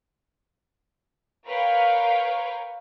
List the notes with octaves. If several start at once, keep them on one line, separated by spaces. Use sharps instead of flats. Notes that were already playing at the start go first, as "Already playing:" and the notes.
A#4 B4 C#5 F5 G5